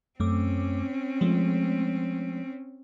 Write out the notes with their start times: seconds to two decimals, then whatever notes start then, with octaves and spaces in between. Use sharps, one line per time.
0.20 F#2 A3 C4 C#4 D6
1.21 F3 G#3 A3